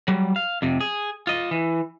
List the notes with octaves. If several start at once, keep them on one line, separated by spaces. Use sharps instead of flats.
F#3 G3
F5
F2 C3
G#4
F4 D#5
E3